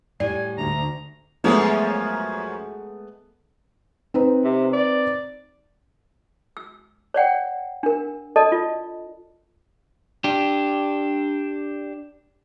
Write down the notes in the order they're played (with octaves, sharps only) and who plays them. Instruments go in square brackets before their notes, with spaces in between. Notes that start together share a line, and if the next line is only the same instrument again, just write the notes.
[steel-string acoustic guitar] A2 G3 [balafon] D5 [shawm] G#5
[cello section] D2 [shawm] A#5
[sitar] F#2 F3 C#4 [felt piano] G#3 A3 B3
[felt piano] C4 D#4 B4
[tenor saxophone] C3
D5
[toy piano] E6
C#5 D5 F#5 G5
D4 A#4
A4 D5 D#5 A5
F4
[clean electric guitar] D4 G4